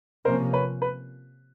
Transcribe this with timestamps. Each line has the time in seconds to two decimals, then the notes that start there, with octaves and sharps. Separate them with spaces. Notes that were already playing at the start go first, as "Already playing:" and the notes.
0.25 C3 F3 A#3 C#4 A#4 C5
0.53 B4 C#5
0.82 B4